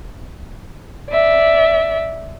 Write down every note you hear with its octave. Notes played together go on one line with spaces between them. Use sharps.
D5 E5